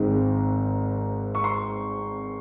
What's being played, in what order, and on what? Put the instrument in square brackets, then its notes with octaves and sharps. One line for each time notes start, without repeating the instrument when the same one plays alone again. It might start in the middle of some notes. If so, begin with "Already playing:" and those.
Already playing: [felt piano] G#1 G#2 D#3 G#3 C4
C#6
C6